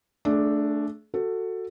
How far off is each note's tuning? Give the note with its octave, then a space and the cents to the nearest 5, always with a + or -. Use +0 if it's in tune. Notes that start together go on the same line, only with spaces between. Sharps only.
A3 +0 D4 +0 G#4 +35
F#4 +0 A4 +15